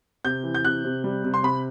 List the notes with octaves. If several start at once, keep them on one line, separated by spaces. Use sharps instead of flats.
C3 G6
E3
G6
C3 F#6
C3
G3
C3
C6
C3 B5